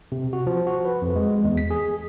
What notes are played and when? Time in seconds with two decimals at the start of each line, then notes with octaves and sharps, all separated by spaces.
0.12 C3
0.33 F#4
0.47 F3
0.67 F#4
0.85 B4
1.02 F2
1.16 G#3
1.45 E2
1.57 B6
1.70 G#4